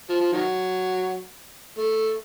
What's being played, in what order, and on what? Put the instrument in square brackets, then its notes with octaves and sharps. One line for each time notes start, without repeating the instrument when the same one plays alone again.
[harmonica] F3
F3
D#3 F#3
A3